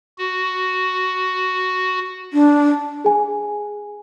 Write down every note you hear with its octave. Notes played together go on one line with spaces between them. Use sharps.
F#4
D4
G#4 G#5